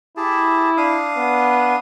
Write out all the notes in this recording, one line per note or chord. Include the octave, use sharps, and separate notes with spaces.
E4 G4 G#4 A5
D4 F5 D#6
B3